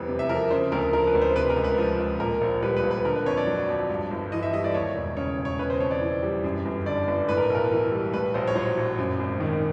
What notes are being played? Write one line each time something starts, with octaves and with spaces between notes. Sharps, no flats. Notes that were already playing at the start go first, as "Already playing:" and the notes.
Already playing: F1 E2 G3 B4
C3
E5
F3 A#4
C#3 C5
D2 A#4
F3 A#4
B4
D2
C5
C3 B4
A#4
C#2
B4
F3
C#2
A#2 A#4
A#1
G3 B4
B4
A#1
B4
D3 A#4
B4
F2 C#5
D5
F#3
F2
G2
G1
E3 D#5
E5
G3 D#5
D5
D#2 C#5
E1
C#3 C#5
E1
C#5
C#3 B4
C5
F2 C#5
D5
E3
G3
F#2
G1
D3 D5
G1
A2 B4
A#4
B1 A#4
E3
G3
A2 B4
A#1 C5
C#5
F#3 C5
A#1
F#2
G#1
D#3